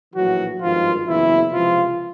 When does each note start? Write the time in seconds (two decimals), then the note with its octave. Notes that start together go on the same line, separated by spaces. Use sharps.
0.14 A#1 A2 E3 F#3 F#4
0.60 G#1 G2 D#3 F3 F4
1.06 F#1 E2 B2 E3 E4
1.51 C#2 C3 E3 F3 F4